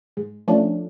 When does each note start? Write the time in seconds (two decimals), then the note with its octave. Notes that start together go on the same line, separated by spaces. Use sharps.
0.17 G#2
0.48 F3 A3 C#4 D4